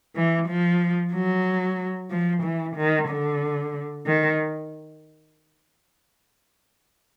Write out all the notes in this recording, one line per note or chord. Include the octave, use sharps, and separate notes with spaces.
E3
F3
F#3
F3
E3
D#3
D3
D#3